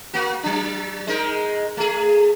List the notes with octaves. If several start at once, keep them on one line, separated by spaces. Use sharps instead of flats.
A#3 F#4
F#3 D4
G#3 D#4 A#4
A3 G#4